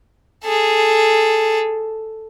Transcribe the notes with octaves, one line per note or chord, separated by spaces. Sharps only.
G#4 A4